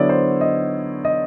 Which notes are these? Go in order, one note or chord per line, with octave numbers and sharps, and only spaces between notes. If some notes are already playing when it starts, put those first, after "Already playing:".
Already playing: D3 F#3 B3 E4 C#5 D5
C5
D#5
D#5